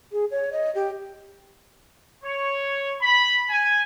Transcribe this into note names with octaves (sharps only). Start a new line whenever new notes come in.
G#4
C#5
D#5
G4
C#5
B5
G#5